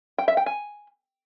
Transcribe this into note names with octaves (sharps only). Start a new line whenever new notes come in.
G5
E5
G5
G#5